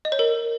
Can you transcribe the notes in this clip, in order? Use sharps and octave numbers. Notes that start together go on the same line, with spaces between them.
D#5
C#5
A#4